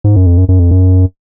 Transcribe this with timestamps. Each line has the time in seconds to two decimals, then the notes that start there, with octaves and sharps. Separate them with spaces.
0.04 G#2
0.16 F#2
0.26 F2
0.38 F#2
0.49 F#2
0.59 F2
0.71 F#2